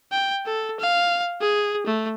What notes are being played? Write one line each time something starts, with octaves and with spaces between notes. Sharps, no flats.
G5
A4
F5
G#4
A3